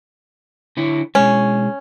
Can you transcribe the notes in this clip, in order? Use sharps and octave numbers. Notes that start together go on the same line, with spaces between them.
D3 E4 C#5
B2 G#3 C#4